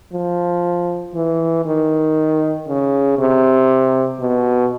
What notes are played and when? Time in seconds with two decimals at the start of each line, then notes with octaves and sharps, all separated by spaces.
0.13 F3
1.15 E3
1.65 D#3
2.68 C#3
3.18 C3
4.20 B2